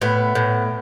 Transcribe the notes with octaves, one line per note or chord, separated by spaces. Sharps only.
A2 B3
A2